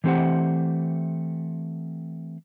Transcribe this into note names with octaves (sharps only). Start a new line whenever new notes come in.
E3 A3 C4 G4 C5 F#5